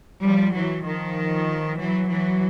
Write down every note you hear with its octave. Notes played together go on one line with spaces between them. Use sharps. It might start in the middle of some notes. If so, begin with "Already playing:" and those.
F3 G3
E3 F#3
D#3 F3
E3 F#3
E3 F#3